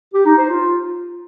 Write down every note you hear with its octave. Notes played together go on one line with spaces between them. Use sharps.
G4
D#4
C5
F4